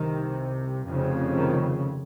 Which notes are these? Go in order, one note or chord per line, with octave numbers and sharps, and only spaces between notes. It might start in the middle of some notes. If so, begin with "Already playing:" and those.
Already playing: C2 C3 D#3
F1 F2 C#3
D#3